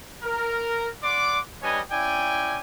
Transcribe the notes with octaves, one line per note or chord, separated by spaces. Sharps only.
A#4
D5 F#5 C6 D6
G3 D4 B4 C#5 D#5 G#5
C#4 E4 D5 G5 G#5